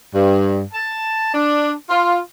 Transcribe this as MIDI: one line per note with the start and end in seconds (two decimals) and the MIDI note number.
0.14 0.61 43
0.73 1.30 81
1.34 1.72 62
1.89 2.17 65